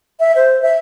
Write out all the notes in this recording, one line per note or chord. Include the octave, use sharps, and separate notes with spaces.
E5
C5
E5